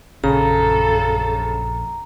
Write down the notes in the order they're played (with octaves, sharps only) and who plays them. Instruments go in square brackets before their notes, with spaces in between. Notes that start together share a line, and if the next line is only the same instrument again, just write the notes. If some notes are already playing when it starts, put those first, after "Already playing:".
[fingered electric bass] A#1 [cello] F#2 A4 [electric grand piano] C#3 [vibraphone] A#5